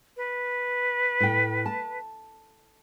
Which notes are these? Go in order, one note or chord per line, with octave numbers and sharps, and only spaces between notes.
B4
A2 G5
A5